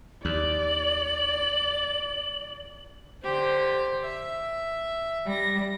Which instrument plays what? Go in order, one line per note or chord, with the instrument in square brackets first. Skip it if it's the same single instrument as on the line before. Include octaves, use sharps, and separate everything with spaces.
[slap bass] D#2 [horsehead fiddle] D5 [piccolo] F#7
[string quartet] D3 G4 C5
E5
G3 A#6